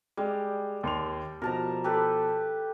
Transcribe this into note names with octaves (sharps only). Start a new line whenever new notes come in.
G3 G#3
D#2 C6 F7
B2 F3 A#4 A5 A#5
G4 A4 B4